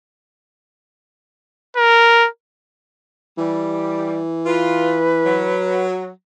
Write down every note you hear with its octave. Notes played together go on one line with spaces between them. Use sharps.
A#4
E3 G3
F4 B4
F#3